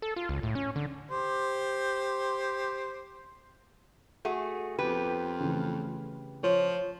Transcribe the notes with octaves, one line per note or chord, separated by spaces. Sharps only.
A4
F4
C#2
A2
C#4
D3
G4 C5
A3 F#4 G#4
F2 B3 G4 B4
C#3 E3 A3
F3 C#5